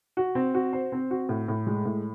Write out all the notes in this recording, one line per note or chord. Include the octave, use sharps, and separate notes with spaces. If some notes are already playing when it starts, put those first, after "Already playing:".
F#4
C4
F#4
C5
C4
F#4
A2
A2
G#3
A2